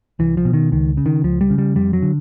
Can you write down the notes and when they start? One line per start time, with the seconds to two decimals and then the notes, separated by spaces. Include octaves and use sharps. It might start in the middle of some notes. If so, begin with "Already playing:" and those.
0.19 C2 E3
0.37 F3
0.45 B2
0.53 D#3
0.72 C#2 D#3
0.97 C#3
1.06 D#3
1.24 C#2 F3
1.41 G3
1.50 C#3
1.58 G3
1.75 F2 G3
1.93 F#3
2.02 D3